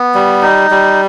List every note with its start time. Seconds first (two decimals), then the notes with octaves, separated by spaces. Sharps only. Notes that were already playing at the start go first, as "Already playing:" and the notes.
Already playing: B3
0.14 G3
0.42 D#4
0.71 G3